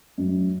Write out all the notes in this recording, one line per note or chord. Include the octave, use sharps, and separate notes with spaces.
F#2